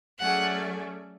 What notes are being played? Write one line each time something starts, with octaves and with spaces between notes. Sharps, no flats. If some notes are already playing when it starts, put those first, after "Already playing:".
F#3 A3 C#4 G#4 D5 F#5